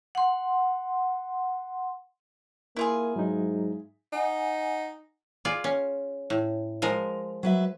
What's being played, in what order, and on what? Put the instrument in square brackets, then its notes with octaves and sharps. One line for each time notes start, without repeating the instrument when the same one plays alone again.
[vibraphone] F#5 C6
[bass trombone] A#3 [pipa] E4 F4 G#4
[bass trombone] G#2 [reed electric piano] F#3 D#4
[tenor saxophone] D#4 [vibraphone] F#5 G#5
[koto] F4 G#4 D5
C#4
A2
F3 G#3 A#4
[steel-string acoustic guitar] F#3 B4 E5